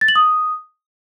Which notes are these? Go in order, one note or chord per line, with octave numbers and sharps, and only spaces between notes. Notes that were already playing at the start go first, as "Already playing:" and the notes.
A6
F#7
D#6